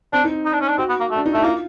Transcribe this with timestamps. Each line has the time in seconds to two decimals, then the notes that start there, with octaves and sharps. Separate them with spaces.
0.13 C4 D4
0.24 D#4
0.46 D#4
0.53 D4
0.61 C#4
0.68 D4
0.78 C4 F#4
0.89 B3
1.00 A#3
1.11 A3 D4
1.26 D#4
1.34 A3 E4
1.44 A#3 F4